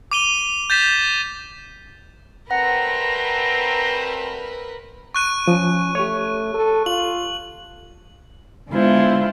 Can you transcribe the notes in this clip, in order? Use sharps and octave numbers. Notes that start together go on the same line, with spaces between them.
D6 D#7 G7
G6 A6 B6 E7
G3 A3 C4 A#4 B4 F#5 A#5
C#6 F#6 D#7
F3 C#4
A3 G4 C#5
A4
F4 F#7
D3 G#3 B3 E4 F4 C5